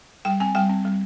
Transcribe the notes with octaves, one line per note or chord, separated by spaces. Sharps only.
G3 G5
C4 G#5
G3 G5
C4
G3